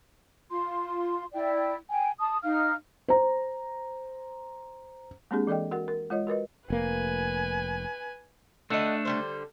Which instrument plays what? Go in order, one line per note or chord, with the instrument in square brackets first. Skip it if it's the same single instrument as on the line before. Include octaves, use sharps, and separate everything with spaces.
[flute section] F4 C6
E4 D5 G5
G5 G#5
A5 D#6
D#4 F5 F6
[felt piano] C5 A#5
[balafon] G#3 A#3 C4 D4 G4 G#4
E3 A4 D5 D#5 G5
F#4 A#4 F#5
A#4
G#3 F4 C#5 D#5
F#4 A#4 B4 D#5
[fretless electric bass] F1 A#3 [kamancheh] B4 G#5
[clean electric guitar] A3 D4 A4 [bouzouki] D#5 F#5
[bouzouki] D3 G3 C5